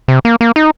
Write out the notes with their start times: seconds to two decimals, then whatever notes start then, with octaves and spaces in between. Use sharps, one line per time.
0.08 C3
0.25 A#3
0.41 A#3
0.56 D#4